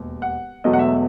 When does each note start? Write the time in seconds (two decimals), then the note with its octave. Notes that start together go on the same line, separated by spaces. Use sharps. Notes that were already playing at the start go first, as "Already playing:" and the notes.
Already playing: E1 D#2
0.22 F#5
0.64 E1 E2 B2 F#3 A3 D#5
0.73 F#5
0.79 E5